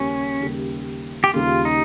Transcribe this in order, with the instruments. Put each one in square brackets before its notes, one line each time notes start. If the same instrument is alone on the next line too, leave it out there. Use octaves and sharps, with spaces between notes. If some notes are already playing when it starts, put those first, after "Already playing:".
Already playing: [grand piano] D#2 C#3 G3 A#3 [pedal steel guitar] C#4
[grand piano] D#2 C#3 G3 A#3
[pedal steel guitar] G4
[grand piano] D#2 C#3 G3 A#3 [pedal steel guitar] F4
[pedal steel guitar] D#4